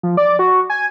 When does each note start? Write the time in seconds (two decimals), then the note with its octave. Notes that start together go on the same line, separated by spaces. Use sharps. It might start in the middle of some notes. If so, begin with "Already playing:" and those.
0.03 F3
0.17 D5
0.39 F#4
0.70 G#5